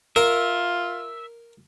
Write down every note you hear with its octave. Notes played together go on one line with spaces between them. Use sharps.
F4 A#4 E5